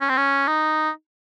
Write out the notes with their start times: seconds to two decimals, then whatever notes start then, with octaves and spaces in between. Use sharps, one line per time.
0.01 C#4
0.09 C4
0.17 C#4
0.48 D#4